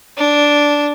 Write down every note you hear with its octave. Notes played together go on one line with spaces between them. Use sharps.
D4